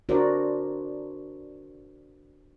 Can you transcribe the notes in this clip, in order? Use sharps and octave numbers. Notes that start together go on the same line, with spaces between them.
D4 F#4 A#4 C5 D5